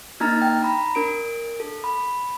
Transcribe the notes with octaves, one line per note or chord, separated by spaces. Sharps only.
A#3 D4 D#4 A#5 F6 A6
G5
A#5 B5
D4 A#4 D7
A4
B5